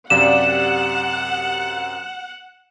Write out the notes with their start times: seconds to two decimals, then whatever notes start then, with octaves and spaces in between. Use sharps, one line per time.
0.10 F#2 C3 G4 D5 F5 F#5 F#6 E7